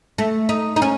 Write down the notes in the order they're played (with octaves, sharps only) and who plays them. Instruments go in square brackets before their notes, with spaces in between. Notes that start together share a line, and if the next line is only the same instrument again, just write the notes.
[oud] A3
D#4
D#4
C#4